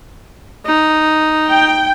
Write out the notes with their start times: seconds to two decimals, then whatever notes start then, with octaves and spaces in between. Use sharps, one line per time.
0.66 D#4
1.49 G5